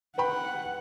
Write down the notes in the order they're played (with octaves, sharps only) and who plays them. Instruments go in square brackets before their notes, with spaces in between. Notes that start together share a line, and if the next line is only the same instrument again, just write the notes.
[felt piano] B4 G5 B5 [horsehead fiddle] F#5